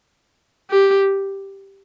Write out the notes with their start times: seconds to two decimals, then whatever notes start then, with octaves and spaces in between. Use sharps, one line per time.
0.70 G4